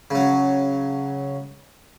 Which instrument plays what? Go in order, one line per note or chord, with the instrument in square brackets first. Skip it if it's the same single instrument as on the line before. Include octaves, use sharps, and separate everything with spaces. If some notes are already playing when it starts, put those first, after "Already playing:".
[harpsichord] C#3 F#3